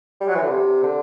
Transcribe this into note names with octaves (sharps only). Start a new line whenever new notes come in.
G3
F#3
E3
D3
C3
D3